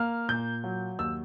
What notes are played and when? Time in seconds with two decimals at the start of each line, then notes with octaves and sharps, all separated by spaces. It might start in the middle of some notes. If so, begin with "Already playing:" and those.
Already playing: A#3 F6
0.28 A#2 G6
0.64 F#3
0.99 D#2 E6